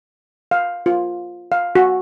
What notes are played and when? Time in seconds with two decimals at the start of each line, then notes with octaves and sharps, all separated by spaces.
0.51 F5
0.86 F4
1.52 F5
1.75 F#4